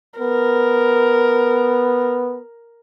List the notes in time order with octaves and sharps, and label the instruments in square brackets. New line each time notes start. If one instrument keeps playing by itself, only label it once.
[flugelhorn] B3 [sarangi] A#4